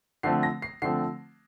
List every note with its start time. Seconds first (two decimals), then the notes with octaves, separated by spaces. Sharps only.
0.23 D3 F3 A3 C4 C7
0.43 A#6
0.62 C7
0.82 D3 F3 A3 C4 C7